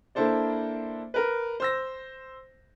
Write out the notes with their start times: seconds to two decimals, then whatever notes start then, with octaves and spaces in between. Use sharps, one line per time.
0.15 A#3 D4 E4 A4 C5 D5
1.14 A#4 B4
1.60 C5 E6 A#6